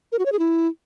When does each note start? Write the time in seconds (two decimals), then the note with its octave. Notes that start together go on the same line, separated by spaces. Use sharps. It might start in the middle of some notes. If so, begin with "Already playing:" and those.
0.12 A#4
0.19 F#4
0.26 C#5
0.32 G#4
0.39 E4